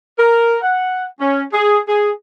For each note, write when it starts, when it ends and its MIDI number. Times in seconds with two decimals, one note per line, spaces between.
0.18 0.57 70
0.63 1.05 78
1.21 1.44 61
1.52 1.80 68
1.87 2.10 68